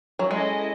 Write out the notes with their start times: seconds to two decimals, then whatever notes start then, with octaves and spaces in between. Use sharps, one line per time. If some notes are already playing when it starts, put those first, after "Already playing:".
0.19 F#3
0.31 G#3 C#4 E4 A4 D#5